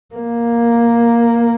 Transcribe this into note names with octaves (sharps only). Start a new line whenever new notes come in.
A#3